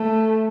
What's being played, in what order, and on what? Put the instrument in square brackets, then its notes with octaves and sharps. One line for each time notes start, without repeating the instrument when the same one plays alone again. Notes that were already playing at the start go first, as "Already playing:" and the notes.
Already playing: [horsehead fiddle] A3